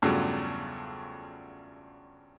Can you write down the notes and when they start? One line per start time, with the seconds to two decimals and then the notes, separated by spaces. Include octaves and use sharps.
0.02 E2 G2 C#3 F3 F#3 A3